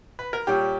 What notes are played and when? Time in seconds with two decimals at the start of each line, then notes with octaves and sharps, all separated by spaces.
0.19 B4
0.33 A#4
0.47 A#2 G3 C#4 G4